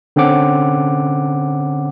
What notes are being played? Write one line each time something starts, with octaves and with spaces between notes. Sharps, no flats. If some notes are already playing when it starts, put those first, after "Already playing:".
D3 C4 C#4 F#5 D6